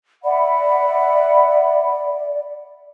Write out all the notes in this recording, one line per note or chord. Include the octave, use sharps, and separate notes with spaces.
D5 E5 F#5 B5